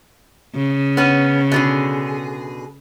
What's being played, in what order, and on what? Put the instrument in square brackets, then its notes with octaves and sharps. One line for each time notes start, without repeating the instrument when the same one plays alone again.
[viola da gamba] C#3
[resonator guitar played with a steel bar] B3 C#4
B2 D3 G#4